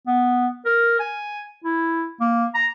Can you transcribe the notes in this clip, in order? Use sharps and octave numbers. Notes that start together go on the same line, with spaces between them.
B3
A#4
G#5
E4
A#3
A#5